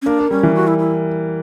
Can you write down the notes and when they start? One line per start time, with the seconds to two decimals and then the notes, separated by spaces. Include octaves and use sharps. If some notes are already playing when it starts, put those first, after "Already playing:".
0.02 C#4
0.06 A#3 D4
0.19 A#3
0.31 G3 C#4
0.43 E3
0.55 F#4
0.67 E4
0.78 E4